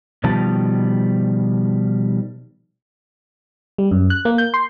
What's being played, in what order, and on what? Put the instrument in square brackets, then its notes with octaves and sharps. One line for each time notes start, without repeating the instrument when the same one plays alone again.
[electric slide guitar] B2 D#3 F3 G3 A5
[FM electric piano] G3
F#2
F#6
A#3
G6
C6